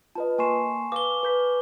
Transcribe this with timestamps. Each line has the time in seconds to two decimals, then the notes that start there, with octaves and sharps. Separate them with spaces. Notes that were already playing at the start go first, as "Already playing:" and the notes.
0.15 F4 B4 D#5 A5
0.38 A#3 G#5 C6 C#6 C7 E7
0.92 B4 F5 D6 G7
1.23 B4 G6 B6